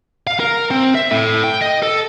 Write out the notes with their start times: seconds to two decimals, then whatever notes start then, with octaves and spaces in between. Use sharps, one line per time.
0.27 F5
0.40 A#4
0.71 C4
0.95 E5
1.12 A2
1.44 G5
1.61 D#5
1.83 A4